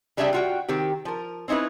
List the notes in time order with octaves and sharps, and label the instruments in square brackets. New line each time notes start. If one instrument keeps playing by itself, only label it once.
[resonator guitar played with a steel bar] C#3 G3 D4 G#4 E5 G5
F4 F#4 G5
D#3 C4 G4
F3 A#4
C4 C#4 D#4 E4 B4